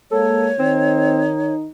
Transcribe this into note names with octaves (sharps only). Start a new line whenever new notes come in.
G#3 A#3 A4 C#5
D#3 C4 D#4